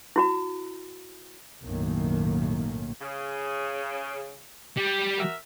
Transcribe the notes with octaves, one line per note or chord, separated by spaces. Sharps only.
E4 F#4 A#5
B1 F#2 A2 D#3 A#3
C#3
G3
F#4 A#4 E5